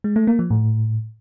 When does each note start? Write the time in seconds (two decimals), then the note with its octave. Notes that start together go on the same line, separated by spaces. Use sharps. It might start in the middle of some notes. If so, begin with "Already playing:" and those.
0.04 G#3
0.16 A3
0.27 A#3
0.39 F3
0.50 A2